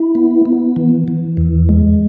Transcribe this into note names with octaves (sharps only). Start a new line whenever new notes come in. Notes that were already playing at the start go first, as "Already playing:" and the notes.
Already playing: E4
B3
B3
E3
E3
E2
G#3